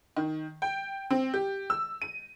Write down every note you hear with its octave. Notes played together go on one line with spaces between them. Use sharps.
D#3
G5
C4
G4
E6
D#7